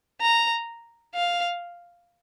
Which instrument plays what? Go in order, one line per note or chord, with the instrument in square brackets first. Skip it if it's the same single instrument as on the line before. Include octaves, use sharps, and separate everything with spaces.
[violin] A#5
F5